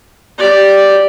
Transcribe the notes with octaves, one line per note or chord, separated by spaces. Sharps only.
G4 D5